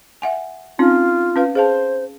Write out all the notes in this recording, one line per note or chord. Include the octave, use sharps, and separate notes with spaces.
E5 F#5 G#5
C4 C#4 D#4 F4
C#4 B4 F5
G#4 C5 F5 A5